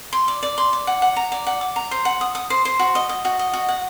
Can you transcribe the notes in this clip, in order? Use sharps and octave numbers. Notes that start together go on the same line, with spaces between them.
C6
D5
D5
C6
D5
F#5
F#5
A#5
D5
F#5
D6
A#5
C5
F#5
D#6
D#6
C5
C5
F#4
D#5
D#5
F#4
D#5
F#4
F#5